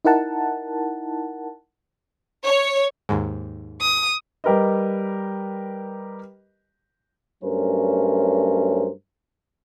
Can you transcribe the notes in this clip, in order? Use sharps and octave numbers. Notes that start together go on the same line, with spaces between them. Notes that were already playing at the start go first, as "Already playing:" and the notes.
D#4 E4 A#4 F#5 A5
C#5
D#2 G#2
D#6
G3 G4 A#4 B4 D#5
G2 F#3 A3 C#4 A#4 C5